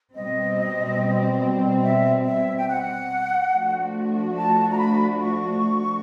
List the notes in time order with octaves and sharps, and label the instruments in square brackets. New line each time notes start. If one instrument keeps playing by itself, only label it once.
[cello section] B2 G3 C4 [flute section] D#5
[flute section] E5
E5
G5
F#5
[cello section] F3 A3 D4 F#4
[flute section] A5
A#5
B5
C#6